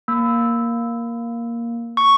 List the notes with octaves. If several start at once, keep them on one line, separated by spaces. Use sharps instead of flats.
A#3
C#6